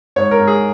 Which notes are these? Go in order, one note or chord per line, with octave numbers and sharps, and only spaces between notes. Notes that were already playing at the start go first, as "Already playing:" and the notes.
G#2 C#5
A#4
G#2
G#4